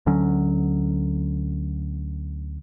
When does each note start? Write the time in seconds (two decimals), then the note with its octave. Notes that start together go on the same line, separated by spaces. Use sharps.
0.06 D2 D3 F#3 C#4